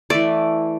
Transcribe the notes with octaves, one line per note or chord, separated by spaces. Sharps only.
E3 A3 D5